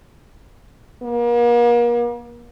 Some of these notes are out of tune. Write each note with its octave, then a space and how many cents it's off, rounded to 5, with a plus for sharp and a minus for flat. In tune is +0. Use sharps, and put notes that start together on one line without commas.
A#3 +40